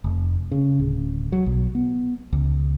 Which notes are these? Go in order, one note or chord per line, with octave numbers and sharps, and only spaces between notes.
F1
C#3
D1
F#3
B1
B3
C#2